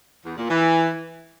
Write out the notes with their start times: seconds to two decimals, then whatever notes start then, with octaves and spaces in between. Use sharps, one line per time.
0.25 E2
0.37 A#2
0.49 E3